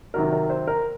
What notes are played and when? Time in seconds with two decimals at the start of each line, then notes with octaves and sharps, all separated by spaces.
0.14 C3 D#3 F#3 A#4
0.32 A#4
0.50 C5
0.67 A#4